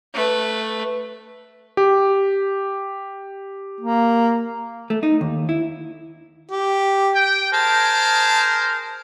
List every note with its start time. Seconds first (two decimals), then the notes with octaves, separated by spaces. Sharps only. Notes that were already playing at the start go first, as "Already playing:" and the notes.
0.14 A3 B4
1.77 G4
3.81 A#3
4.90 A3
5.03 D#4
5.21 D#2
5.49 E4
6.51 G4
7.15 G5
7.53 G#4 A#4 C5 A5